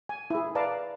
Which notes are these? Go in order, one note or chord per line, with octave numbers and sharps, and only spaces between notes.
G#5
E4 G#4
B4 D5 F5 A5 A#5